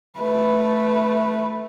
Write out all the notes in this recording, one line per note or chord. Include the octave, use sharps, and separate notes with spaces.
A3 B4